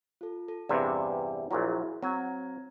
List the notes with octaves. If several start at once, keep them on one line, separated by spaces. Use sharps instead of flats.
F4 A4
A4
E2 G2 C3 B4 D5
A#1 A#2 F#3 E4 F#4 G#4
F#3 C4 A#5 G#6